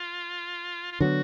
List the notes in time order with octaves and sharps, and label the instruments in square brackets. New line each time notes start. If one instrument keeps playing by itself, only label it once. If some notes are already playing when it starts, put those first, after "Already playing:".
Already playing: [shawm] F4
F4
[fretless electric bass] D3 F#3 B3 [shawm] F#4